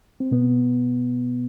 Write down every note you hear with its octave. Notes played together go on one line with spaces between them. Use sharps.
C4
B2 B3